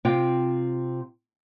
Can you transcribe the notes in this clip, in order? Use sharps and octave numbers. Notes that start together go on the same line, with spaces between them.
C3 C4 F4 G5